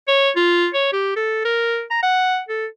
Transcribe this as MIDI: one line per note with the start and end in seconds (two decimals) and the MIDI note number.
0.08 0.30 73
0.36 0.67 65
0.74 0.90 73
0.93 1.13 67
1.16 1.43 69
1.45 1.83 70
1.91 1.99 82
2.03 2.40 78
2.49 2.66 69